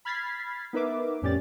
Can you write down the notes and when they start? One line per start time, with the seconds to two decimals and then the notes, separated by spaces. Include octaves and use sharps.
0.05 B5 F6 G#6 A6 B6 C7
0.73 B3 D#4 A#4 B4 E5 D6
1.22 F2 A2 C#4 G4 D5 A6